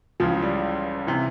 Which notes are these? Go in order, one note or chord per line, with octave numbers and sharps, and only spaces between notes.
C#2 C#3 E3 F3
G3
C3 E3